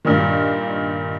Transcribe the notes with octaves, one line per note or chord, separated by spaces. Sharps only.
G2 A#2 D#3